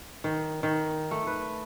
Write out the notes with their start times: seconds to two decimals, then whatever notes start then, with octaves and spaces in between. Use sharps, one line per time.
0.24 D#3
0.63 D#3
1.11 A3
1.27 B4